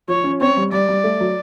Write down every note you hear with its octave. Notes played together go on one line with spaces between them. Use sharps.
F3 C#5
C#4
C4 C#5
G3
G3 D5
G3
A3
F#3